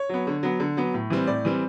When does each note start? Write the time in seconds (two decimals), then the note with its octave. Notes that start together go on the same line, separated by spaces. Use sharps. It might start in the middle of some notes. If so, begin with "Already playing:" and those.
Already playing: C#5
0.09 F#3 B3
0.27 D3
0.43 F#3 B3
0.60 D3
0.77 F#3 B3
0.94 A2
1.10 E3 G3 C4
1.27 A2 D5
1.45 E3 G3 C4